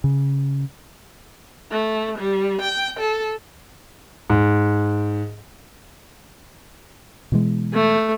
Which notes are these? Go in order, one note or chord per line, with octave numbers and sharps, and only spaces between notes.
C#3
A3
G3
G5
A4
G#2
B2 E3 G#3
A3